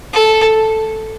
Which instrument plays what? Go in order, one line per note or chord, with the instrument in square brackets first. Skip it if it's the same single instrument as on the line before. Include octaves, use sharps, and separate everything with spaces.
[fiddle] A4